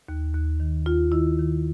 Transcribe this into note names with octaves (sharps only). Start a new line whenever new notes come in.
D#2
D#2
D#3
D#2 F4
D#3 E4
D#3